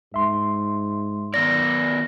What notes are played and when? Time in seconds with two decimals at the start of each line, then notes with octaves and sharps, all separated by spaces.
0.14 G#2 E5 C6
1.34 D#3 B3 D5 A#6